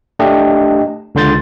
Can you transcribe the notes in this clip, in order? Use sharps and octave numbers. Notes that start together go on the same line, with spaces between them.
A3 D4 G4 D#5
C#2 D3 C6 G6 A6